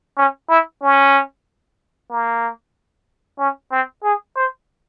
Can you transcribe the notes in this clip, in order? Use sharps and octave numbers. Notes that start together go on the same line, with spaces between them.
C#4
E4
C#4
A#3
C#4
C4
G#4
C5